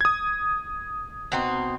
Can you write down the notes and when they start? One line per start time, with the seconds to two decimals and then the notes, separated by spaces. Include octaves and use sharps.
0.01 D#6 G#6
1.32 B2 C4 D#4